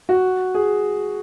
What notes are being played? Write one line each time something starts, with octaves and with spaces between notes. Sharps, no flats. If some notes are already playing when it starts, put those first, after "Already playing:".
F#4
G#4